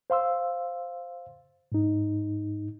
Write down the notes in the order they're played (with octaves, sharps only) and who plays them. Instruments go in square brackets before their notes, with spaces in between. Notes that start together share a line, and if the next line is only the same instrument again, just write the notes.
[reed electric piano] C5 F5 C6 E6
G#2 D#4